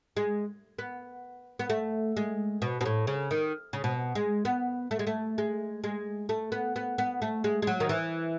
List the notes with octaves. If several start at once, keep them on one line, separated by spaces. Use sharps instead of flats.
G#3
B3
B3
A3
G#3
B2
B2
A2
C#3
D#3
C#3
B2
G#3
B3
A3
G#3
A3
G#3
G#3
A3
B3
B3
B3
A3
G#3
G#3
F#3
D#3
E3